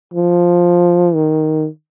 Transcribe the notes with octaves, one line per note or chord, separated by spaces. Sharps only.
F3
D#3